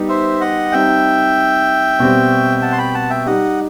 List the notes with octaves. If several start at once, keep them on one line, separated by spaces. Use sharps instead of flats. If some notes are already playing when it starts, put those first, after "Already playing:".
Already playing: G3 B3 D#4 G4
C5 E5
D#5 F#5
G3 C4 D#4 E5 G5
B2 G3 C4
F#5 A5
C6
G5 B5
F#5 A5
E5 G5
G3 D#4 G4 D#5 F#5